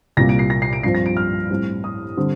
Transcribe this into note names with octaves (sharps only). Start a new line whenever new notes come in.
C2 A#2 G3 A#3 A#6
D7
C7
A#6
C7
D7
G2 F3 C4 C7
A#6
D7
F6
A2 G3 C4
D#6
D3 G3 C4